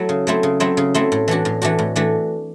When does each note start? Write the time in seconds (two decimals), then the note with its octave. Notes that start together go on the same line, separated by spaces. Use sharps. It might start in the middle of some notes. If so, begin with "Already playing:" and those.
Already playing: F#3 A3 E4
0.09 C#3
0.27 F#3 A3 C4 E4
0.43 C#3
0.60 F#3 A3 C4 E4
0.77 C#3
0.94 F#3 A3 C4 E4
1.12 A2
1.28 E3 A3 D4 F#4
1.45 A2
1.62 E3 A3 D4 F#4
1.79 A2
1.96 E3 A3 D4 F#4